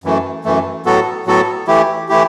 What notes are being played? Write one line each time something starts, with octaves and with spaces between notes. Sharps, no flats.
F#2 E3 A3
F#2 E3 A3
A2 F#3 B3 F#4 A4
A2 F#3 B3 F#4 A4
E3 A3 E4 G4
E3 A3 E4 G4